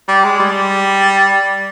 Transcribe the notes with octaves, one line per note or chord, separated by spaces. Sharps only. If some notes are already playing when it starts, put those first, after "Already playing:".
G3
G#3
G3